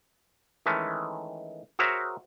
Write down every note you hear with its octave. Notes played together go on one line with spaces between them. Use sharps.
D#3 E3 G#3 A3 C#4
F#4 G#4 A#4 C5 C#5 E5